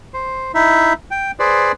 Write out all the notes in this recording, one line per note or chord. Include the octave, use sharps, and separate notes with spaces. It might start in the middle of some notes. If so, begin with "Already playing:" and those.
C5
D#4 E4 E5
G5
G#4 B4 C5 D5